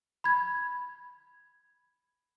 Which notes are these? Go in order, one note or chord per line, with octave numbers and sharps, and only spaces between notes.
B5 G#6